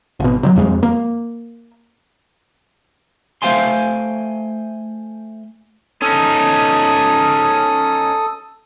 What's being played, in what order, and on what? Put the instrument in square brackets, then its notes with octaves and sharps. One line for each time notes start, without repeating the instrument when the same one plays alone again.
[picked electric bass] G#1 B2
C3 F#3
E1 F2 G#3
A#3
[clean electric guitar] A3 C5 F5 G5 G#5 C6
[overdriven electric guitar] C#4 D#4 [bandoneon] A4 D#6